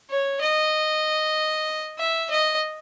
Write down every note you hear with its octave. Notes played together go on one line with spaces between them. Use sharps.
C#5
D#5
E5
D#5